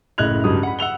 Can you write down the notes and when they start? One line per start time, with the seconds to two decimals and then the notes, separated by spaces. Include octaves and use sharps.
0.18 F#1 A2 D#5 F#6 G#6 F7
0.44 C#2 G2 F#3 D#6
0.63 F#5 B5
0.79 F#5 E6 F7 G7